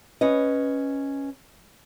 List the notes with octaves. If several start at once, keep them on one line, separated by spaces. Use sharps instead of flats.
C#4 B4 D#5